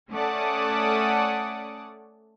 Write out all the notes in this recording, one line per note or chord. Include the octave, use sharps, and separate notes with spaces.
A3 C#4 A4 D5 F#5 D#6